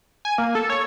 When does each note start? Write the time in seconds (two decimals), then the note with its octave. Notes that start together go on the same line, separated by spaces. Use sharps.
0.25 G#5
0.38 A#3
0.55 A4
0.70 C#5